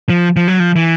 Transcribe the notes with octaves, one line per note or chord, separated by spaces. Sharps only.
F3
F3
F#3
F3
E3